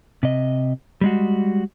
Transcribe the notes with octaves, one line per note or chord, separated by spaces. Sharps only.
C3 D#5
G3 G#3 F#4